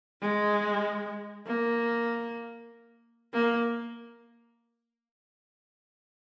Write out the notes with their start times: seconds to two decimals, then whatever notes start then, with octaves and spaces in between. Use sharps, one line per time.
0.22 G#3
1.47 A#3
3.34 A#3